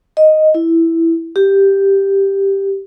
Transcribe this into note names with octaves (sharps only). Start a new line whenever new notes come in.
D#5
E4
G4